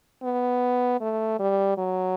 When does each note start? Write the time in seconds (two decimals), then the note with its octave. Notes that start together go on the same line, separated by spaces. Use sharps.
0.23 B3
1.01 A3
1.39 G3
1.78 F#3